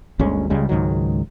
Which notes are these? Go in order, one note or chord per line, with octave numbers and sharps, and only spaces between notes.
G1 D2 G#3 C#4
C#2 C#3 G3 G#3
C#2 G#2 D#3 F#3